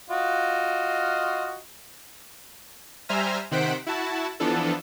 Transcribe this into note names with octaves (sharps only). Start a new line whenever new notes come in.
F4 F#4 D#5
G3 C5 E5 G#5 A#5 F6
C3 D#3 C5 F#5 B6 D7
E4 F#4 A5
E3 F3 B3 D4 A4